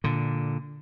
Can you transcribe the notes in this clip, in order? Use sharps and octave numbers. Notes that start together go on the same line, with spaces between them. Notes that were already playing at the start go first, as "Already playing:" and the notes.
A#2 D3